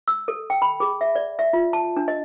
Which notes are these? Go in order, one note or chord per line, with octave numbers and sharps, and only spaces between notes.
E6
A4
G5
B5
G#4
E5
D5
E5
F4
A5
D4
D#5